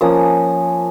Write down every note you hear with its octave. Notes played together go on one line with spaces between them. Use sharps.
F3 A#3 C#4 D#6